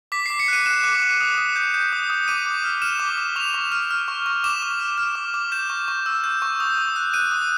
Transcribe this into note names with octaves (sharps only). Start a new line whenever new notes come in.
D6 B6
D6 C7
C#7
F#6 D#7
F#6 E7
D6
D6
D#6
D#6
G6
G6
D#6
D#6
D6 D#7
D6
F6
F6 E7
D6
D6
C#6 F7
C#6
F6
F6
C#6
C#6
D6 E7
D6
F6
F6
D6
D6
G6 E7
C#6
C#6
E6
G6
C#6
D#6
D#6
F#6
F#6 D#7
D#6